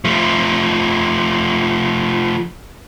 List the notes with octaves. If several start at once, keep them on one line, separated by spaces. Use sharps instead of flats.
F3 A3